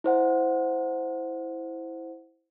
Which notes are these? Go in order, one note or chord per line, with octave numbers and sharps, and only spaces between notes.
E4 C5 F#5